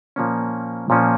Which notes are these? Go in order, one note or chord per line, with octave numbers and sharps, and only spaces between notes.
A#2 F3 A#3 C#4
A#2 F3 A#3 C#4